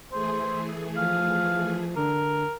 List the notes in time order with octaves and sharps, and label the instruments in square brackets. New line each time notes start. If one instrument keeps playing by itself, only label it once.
[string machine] E3 A3 G#4 [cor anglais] C5
[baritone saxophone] F3 [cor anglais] F5
[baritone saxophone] D3 [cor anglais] A#4